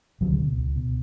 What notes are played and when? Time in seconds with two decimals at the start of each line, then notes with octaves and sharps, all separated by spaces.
0.21 C#2 D3 F#3
0.32 D3 F#3
0.39 B2
0.57 C#2
0.76 B2